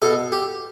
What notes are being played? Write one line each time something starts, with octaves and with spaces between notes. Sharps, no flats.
B2 A4
G4